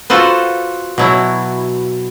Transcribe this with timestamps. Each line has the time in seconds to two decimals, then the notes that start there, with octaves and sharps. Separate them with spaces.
0.10 F4 F#4 A4 B4 C5
0.98 B2 F#3 E4